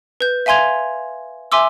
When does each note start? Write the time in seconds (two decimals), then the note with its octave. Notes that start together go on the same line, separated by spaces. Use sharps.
0.21 B4 G6
0.46 E5 F5 G#5 C6 G#6 F7
1.52 E5 G#5 C6 D6 E6